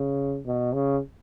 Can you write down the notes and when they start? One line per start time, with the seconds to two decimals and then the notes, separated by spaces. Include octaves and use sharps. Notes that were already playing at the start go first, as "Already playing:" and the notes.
Already playing: C#3
0.46 B2
0.73 C#3